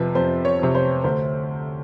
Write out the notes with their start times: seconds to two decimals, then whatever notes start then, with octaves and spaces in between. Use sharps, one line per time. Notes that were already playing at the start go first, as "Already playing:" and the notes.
Already playing: F2 C3 F3 B4
0.15 F2 C5
0.45 C#5
0.59 C3 F3
0.75 C5
1.04 D2 C5